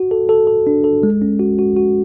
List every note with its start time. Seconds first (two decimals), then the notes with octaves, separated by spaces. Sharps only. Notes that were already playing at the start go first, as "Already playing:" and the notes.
Already playing: F#4
0.11 A4
0.29 A4
0.47 A4
0.67 D4
0.84 A4
1.03 G#3
1.22 C#4
1.39 F#4
1.59 F#4
1.76 F#4